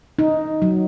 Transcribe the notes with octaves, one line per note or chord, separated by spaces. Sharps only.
D#4
F#3